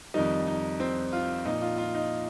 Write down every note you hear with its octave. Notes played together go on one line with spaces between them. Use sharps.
F2 D#3 G3 D#4
D#4
C4
F4
A#2 F3 D#4
F4
F4
D#4